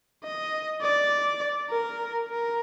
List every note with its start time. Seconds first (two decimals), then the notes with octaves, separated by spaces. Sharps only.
0.24 D#5
0.82 D5
1.70 A#4
2.28 A#4